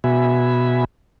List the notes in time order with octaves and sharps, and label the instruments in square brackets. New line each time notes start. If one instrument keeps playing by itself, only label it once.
[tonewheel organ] B2 B3 F#4 E5 G#5 B5